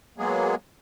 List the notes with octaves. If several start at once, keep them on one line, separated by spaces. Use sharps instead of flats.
F#3 G#3 A#3 B3 G#4